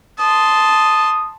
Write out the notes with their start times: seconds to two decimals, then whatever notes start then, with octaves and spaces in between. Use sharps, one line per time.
0.19 A5 C6 D#6